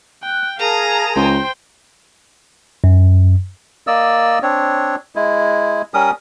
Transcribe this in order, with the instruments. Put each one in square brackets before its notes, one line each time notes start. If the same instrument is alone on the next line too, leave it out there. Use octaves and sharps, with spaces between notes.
[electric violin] G5 [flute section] F#6
[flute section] G#4 A#4 A5 [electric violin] F5 [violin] A#5 D#7
[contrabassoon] C#2 [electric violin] C5 G5
[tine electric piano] F#2
[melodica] A#3 D5 D#5 E6
C4 D4 C#5
G#3 E4
G3 C#4 A#4 D#6